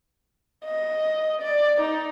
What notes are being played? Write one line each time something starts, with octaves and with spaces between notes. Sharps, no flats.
D#5
D5
D#4